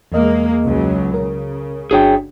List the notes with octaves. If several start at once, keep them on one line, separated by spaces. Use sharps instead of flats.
E2 G#3 A#3 D#5
C#2 C#3 F#3
C#3 A#4
G1 D4 F#4 G#4 C#5 G5